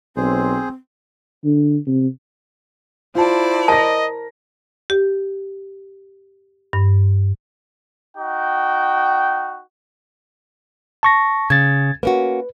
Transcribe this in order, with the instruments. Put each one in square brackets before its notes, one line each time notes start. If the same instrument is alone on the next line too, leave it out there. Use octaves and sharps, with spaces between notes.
[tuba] B1 [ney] C4 [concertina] G#4 C5
[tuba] D3
C3
[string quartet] E4 C5 D5 [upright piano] F4 A5
[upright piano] A#4 A#6 [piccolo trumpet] D#5 [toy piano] A5
[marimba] G4
G2
[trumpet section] D#4 F#4 G5
[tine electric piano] A5 C#6 A#6
[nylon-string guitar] C#3 [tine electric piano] G#6 A6
[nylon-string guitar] A#3 C#4 F#4 [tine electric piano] B4